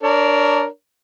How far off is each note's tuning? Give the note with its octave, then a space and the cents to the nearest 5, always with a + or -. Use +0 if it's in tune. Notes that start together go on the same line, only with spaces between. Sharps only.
D4 +0 A#4 +0 C#5 +20